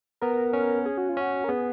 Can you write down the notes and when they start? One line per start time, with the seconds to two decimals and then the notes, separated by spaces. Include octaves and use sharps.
0.21 B3 A#4
0.53 C#4
0.86 G#4
0.98 F#4
1.09 F4
1.17 C#4 F#4
1.44 A#4
1.49 B3 G#4